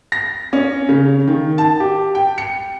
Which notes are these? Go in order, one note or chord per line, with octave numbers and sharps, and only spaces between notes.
A#6
C#4
C#3
D#3
A5
G4
G5
C#7